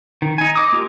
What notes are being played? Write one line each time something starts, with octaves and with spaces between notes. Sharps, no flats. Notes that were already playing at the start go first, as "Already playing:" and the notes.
D#3
D#4 G#5
D#5 D6 D#6
A#3 F4 G4 A#4